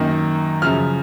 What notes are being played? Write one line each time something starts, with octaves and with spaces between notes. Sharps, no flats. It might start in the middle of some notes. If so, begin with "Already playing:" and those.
Already playing: F#2 D#3 A#3 D#4
F#2 C#3 F3 F6